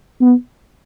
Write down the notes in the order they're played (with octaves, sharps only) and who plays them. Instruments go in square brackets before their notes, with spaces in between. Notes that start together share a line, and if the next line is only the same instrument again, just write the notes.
[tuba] B3